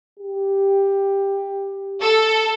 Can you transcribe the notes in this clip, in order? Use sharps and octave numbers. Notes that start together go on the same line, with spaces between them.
G4
A4